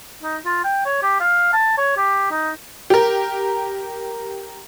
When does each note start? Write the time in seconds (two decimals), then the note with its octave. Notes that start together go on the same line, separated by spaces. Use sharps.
0.23 D#4
0.46 F4
0.64 G5
0.86 C#5
1.03 G4
1.20 F5
1.53 A5
1.78 C#5
1.97 G4
2.31 D#4
2.90 G4 A#4